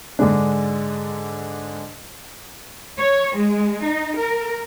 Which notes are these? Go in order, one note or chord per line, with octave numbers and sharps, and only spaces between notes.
G#2 D3 G#3 D4
C#5
G#3
D#4
A#4